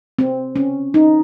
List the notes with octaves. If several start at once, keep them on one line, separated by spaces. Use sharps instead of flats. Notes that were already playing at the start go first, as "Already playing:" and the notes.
C4
C#4
D#4